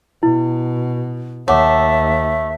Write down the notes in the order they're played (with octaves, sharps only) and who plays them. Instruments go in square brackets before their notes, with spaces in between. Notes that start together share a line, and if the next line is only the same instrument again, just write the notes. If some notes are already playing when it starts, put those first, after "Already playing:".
[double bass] B2 [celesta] E4
[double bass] D#2 [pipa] A3 [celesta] C#5 F#5 D6 [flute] E5